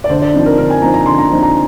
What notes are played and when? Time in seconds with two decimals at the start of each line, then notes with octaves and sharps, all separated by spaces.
0.04 D5
0.09 D3 C5
0.22 D5
0.34 F3 C4 D#4
0.46 A#4
0.57 D3 A#4
0.70 G#5
0.82 F3 C4 D#4 A#5
0.94 A#5
1.06 D3 C6
1.18 A#5
1.30 F3 C4 D#4
1.43 A#5